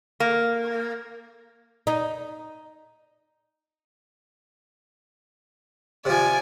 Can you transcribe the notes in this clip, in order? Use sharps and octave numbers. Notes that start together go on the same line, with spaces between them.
A#3
D#4
C3 F3 D5 G#5